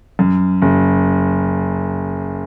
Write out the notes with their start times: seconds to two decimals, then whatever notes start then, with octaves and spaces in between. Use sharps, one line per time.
0.19 F#2
0.62 F#1